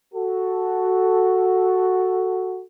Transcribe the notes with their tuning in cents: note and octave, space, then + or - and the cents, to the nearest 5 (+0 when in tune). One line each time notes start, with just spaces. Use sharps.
F#4 +0 A4 +0